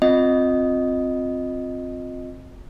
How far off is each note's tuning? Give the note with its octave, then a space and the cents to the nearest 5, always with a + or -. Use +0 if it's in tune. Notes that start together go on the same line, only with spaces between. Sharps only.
C4 +0 F4 +25 D#5 +0